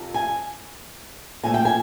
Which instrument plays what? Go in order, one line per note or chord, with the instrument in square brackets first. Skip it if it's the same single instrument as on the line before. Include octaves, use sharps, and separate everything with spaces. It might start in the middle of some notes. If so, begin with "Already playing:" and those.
Already playing: [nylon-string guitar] F2 C3 F3
G#5
A#2 F3 A3 G#5
G5
G#5